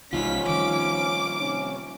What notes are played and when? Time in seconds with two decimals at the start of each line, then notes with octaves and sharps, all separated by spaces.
0.13 C2 E3 F3 G#3 C#4 D#4 F4 B6
0.49 D#3 G3 A3 D6
1.40 C3 C#4